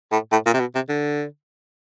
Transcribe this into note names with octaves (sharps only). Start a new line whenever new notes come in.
A2
A2
A#2
C3
B2
C3
D3